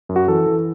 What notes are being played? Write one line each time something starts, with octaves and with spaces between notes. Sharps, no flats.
F#2
F#4
E3 A4
E3